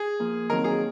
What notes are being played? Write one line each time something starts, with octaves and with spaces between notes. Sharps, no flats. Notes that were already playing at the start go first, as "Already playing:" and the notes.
Already playing: G#4
F3 A#3 F4
D#3 F#3 C4 A#4
G#4